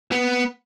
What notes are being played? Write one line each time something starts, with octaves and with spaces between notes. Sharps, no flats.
B3